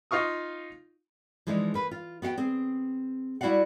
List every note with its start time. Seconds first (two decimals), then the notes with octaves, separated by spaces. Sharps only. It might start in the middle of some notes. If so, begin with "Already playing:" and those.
0.11 D#4 F4 F5 C#6 D#6
1.47 E3 F3 G#3 D4 D#4
1.74 A#3 B4
1.91 F4
2.22 B3 F#4 F5 G5
2.38 C4 G#4
3.41 G3 E4 F#4 D5 F5 F#5